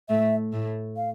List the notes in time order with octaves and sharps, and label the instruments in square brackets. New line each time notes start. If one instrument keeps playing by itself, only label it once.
[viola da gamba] A2 A3 [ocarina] E5
[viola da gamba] A2 A3
[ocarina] F5